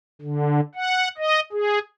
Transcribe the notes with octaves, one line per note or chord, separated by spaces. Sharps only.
D3
F#5
D#5
G#4